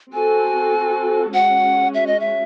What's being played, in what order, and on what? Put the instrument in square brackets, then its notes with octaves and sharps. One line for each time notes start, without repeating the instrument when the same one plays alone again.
[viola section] C4 F#4 A4 [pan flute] G#5
[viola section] G#3 C#4 F#4 [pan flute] F#5
[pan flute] E5
D#5
E5